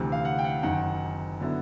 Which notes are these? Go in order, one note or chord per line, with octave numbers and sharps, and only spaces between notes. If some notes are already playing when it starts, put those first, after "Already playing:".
Already playing: D2 C3 E3
F5
F#5
G5
F#5
F#1 F#2 D#3 F#5
D3 F#3 B3 E4